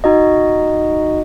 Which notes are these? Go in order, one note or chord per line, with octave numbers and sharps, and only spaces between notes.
D#4 F#4 D#5